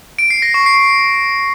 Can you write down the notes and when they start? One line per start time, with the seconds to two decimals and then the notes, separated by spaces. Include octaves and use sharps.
0.19 D7
0.30 C7
0.42 A#6
0.54 C#6
0.66 C7